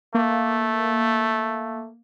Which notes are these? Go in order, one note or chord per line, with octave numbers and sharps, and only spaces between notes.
A3 A#3